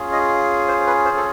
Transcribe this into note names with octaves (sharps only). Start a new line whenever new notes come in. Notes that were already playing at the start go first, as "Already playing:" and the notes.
Already playing: C#4 F4 G#4
D#5
C5
B4
C5
A4